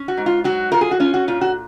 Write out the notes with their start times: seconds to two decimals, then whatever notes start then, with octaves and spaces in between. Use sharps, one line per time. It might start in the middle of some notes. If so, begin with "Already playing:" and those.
Already playing: C#4
0.08 F#4
0.17 G#2
0.26 F4
0.44 F#3 F#4
0.72 F4 A#4
0.81 G#4
0.91 F#4
1.00 C#4 F4
1.14 F#4
1.28 A#2 F4
1.41 F#4